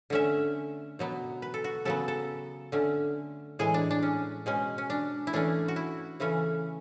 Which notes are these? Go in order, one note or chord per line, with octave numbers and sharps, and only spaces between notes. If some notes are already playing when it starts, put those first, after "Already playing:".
D3 A3 C#4 E5
B2 F#3 B3
B4
A4
F#4
C#3 F#3 B3 A4
A4
D3 A3 C#4
A2 E3 G#3 G#4
D4
D4
C#4
B2 G#3 C#4
C#4
D4
E4
E3 A3 C#4 D4
F#4
E4
C#3 E3 A3 C#4